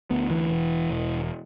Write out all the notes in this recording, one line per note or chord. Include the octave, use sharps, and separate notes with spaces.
D2 B3
E3
E1
E1